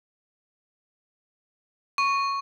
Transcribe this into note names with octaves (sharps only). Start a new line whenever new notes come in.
C#6